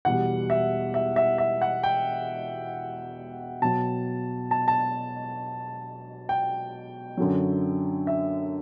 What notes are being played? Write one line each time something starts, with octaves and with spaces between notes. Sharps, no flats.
E2 B2 G3 F#5
E5
E5
E5
E5
F#5
G5
B2 F#3 A5
A5
A5
G5
F#2 D3 F#3
E5